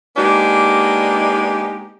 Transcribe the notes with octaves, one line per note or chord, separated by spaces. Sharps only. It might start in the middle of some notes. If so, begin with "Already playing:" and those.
G#3 A#3 B3 D4 D#4 G4